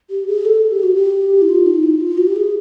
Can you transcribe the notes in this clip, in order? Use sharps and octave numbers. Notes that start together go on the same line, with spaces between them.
G4
G#4
A4
G4
F#4
G4
E4
F4
D#4
E4
F4
F#4
G4
G#4